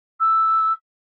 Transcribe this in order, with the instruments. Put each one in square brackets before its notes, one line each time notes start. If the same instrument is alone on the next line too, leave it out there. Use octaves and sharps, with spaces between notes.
[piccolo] E6